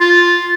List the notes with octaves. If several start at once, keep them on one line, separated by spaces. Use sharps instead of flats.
F4